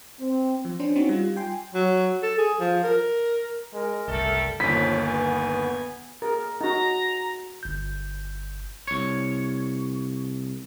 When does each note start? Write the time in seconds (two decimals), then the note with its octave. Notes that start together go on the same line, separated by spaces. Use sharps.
0.20 C4
0.65 F3
0.80 C#4 D4 C5
0.96 C4 C#4 D#4 F#4
1.09 G3 F4
1.36 G5 G#5 C6
1.74 F#3
2.23 A4
2.38 G#4
2.60 F3
2.84 A#4
3.73 G#3 A#4
4.08 F#1 C2 G3 A3 A4
4.60 G1 D#2 F3 C#4 B6
5.06 B3 G#5
6.22 G#4 A#4
6.61 D#4 F#4 A#5
7.63 G1 G6
8.87 C2 C#5